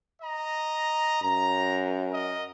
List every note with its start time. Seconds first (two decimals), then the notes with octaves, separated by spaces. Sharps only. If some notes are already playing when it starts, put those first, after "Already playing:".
0.21 D#5 A#5
1.22 F#2 A#5
2.10 A#4 D#5